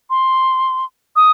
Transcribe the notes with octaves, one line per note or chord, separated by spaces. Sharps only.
C6
D#6